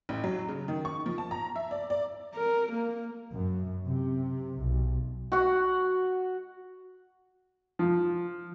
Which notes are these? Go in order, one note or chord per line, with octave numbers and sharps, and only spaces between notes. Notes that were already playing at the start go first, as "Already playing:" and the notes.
A1
F#3
C#3
D#3
C#6
F3
A5
A#5
E5
D5
D5
A#4
A#3
F#2
C3
B1
F#4 F#5
F3